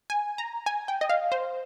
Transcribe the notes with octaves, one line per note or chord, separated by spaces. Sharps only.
G#5
A#5
G#5
G5
D#5
F5
C5